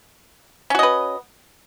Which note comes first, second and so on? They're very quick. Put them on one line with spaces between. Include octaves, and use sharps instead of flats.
C#4 F#4 D#5 B4